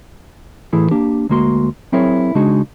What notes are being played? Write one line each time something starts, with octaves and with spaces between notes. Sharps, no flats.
A2 E3 E4 G#4 A4
A#3 D4 G4
D2 G#3 A#3 F#4 C6
F#3 C4 E4 G#4 A#4 C#5
C#3 G#3 D4 D#4 F#4 G#4